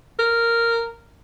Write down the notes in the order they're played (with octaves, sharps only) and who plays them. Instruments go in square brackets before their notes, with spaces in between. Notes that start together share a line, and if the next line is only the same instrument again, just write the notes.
[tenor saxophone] A#4